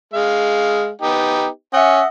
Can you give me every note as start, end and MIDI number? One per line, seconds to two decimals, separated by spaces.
0.14 0.90 56
0.14 0.90 77
1.02 1.47 59
1.02 1.47 63
1.02 1.47 67
1.74 2.00 61
1.74 2.07 75
1.74 2.07 76
1.74 2.07 78